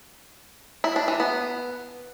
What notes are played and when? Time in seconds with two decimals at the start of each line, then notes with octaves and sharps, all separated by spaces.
0.84 E4
0.96 D4
1.08 E3
1.20 B3